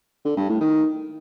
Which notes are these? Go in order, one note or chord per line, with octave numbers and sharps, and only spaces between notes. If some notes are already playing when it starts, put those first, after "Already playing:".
D3
G2
A2
D#3